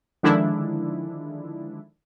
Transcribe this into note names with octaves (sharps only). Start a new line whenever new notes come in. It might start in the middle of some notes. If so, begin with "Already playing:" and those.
D3 D#3 F3 G#3 D4 E4